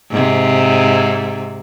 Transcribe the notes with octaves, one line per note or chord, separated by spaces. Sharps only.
G#2 C3